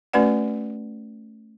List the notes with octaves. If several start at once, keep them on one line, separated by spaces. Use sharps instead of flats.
A3 C#4 F#4 B4 D5 F#5